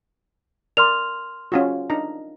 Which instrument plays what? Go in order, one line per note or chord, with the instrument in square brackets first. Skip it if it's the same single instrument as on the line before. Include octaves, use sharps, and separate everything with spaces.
[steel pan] A#4 D5 [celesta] C6 F6 F7
[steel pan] C#4 F4 F#4
D4 D#4 A#5